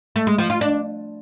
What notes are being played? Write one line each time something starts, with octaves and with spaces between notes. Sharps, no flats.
A3
G#3
F3
F4
D4